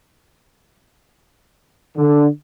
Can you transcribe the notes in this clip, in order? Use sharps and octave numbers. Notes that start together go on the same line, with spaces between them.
D3